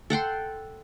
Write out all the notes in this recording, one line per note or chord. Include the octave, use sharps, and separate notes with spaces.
A4 F#5 G5 C6